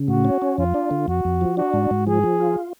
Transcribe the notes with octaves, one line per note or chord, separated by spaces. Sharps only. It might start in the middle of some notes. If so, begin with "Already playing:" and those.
Already playing: C#3
A2 F#4
C#4
C#4
F2 F4
D4
D3
F2 F#4
F2
F3
D4 F#4
G#2
G#2
F3 G#4
F3
F4